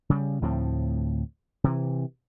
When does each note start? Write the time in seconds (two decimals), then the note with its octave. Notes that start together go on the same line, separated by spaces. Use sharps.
0.10 C#3 G3
0.42 D2 A2 F3 C4
1.64 C3 E3